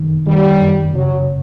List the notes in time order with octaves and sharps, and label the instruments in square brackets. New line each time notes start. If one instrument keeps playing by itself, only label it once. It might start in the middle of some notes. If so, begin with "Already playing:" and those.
Already playing: [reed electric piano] F#2 D#3
[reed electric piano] D#3 [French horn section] G3
[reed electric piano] F#2
[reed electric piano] C#3 [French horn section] F#3